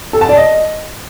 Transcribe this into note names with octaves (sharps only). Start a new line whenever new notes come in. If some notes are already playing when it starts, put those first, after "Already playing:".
A4
A5
D5
D#5